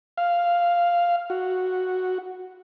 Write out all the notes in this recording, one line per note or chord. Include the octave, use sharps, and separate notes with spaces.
F5
F#4